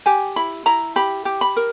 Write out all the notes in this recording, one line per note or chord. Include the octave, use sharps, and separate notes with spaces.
G4 G#5
E4 B5
E4 A#5
G4 B5
G4
B5
A#4